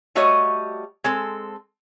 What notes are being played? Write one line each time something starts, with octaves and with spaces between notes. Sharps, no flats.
G3 A3 F#4 G4 C#5 D#5
G#3 C4 A4